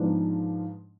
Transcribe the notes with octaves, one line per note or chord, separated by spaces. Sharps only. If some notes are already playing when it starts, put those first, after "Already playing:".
Already playing: G#2 F3 G#3 B3 D4